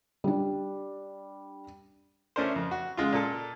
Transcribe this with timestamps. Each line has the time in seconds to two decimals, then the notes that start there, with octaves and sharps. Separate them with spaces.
0.24 G3 D4
2.36 A3 C#4 D4 A#4 C5
2.55 F2
2.71 F#4
2.97 C#3 G#3 F4
3.12 A#2 A4